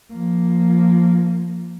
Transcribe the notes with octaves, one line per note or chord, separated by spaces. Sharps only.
F3 A#3